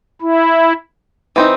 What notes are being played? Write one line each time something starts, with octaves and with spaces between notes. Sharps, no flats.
E4
E3 C4 D#4